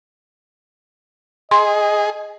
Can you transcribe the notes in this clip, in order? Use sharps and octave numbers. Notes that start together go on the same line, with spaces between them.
G#4 D#5 C6